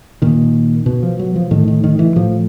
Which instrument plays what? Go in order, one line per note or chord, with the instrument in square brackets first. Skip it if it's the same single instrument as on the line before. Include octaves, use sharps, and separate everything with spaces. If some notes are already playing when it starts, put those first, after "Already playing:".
[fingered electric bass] A#2 D#3
B2
F3
F#3
F3
A2 D#3
D#3
D#3
E3
A2 F3